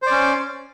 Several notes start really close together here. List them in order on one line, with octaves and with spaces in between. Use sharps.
C5 D5 C#4